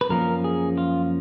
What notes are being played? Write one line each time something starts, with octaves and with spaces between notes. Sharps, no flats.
B4
F#2 F3 A#3 C#4 A#4
G#4
F4